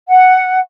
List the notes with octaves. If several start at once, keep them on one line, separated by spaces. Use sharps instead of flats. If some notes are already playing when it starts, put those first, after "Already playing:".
F#5